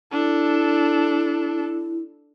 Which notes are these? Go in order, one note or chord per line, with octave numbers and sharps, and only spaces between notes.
D4 E4 A4